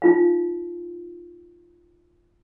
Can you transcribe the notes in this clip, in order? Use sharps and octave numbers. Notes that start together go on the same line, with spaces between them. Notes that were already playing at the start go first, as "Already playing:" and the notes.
D#4 F4 F5